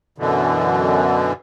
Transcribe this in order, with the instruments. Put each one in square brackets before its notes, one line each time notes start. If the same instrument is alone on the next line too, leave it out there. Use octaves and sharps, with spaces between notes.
[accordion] F#2 B2 D3 E3